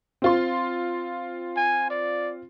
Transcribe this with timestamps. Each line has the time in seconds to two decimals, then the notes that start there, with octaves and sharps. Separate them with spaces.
0.22 C4 F4 C6
1.57 G#5
1.90 D5